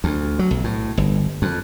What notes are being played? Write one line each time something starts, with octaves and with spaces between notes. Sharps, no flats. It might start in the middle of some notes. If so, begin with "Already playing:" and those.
D2
F#3
B1
A2
G1
F2